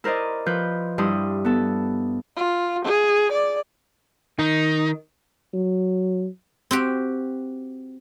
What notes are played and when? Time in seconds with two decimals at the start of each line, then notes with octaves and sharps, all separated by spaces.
0.04 E4 A#4 C5 D5 D#5
0.46 F3 F4 B4 G6
0.98 G2 G3 E4 C6 D#6
1.45 B3 A4
2.36 F4
2.85 G#4
3.32 D5
4.39 D#3 D#4
5.53 F#3
6.71 C4 F#4 G4